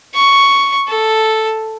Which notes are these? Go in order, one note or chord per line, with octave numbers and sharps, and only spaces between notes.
C#6
A4